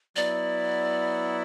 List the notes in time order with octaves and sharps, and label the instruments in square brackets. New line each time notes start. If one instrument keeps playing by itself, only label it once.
[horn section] F#3 B3 E4 [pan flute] D5